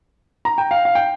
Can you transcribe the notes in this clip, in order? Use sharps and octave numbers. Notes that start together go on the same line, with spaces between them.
A#5
G5
F5
F5
G5